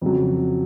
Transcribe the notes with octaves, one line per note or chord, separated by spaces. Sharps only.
F2 C#3 F#3